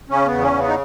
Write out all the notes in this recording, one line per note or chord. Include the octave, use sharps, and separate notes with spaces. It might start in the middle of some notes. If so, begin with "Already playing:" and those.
C#3 C#4
B3
E2
C#4
C#3
B3
D#4